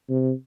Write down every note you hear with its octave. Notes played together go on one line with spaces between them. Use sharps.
C3